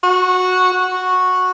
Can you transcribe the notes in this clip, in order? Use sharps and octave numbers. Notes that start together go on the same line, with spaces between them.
F#4
F#4